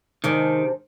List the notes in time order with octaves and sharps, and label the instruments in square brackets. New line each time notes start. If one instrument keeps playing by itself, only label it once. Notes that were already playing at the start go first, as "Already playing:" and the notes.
[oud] C3 G#3 D4 [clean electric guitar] D#3